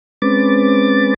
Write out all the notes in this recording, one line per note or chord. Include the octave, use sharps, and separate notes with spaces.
G#3 C4 C#4 B4 D6 A6